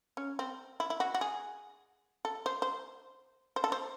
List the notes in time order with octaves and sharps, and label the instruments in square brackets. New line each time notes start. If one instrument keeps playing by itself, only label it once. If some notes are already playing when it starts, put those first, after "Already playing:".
[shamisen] C#4
C4
E4
E4
F#4
F#4
G#4
A4
C5
C5
C5
A4
C5